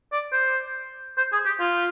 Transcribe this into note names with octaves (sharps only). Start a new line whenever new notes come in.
D5
C5
C5
G#4
G4
F4